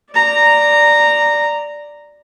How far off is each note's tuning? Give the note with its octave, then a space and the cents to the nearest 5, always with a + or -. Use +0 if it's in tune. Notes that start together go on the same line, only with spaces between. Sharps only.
D5 +0 A#5 -10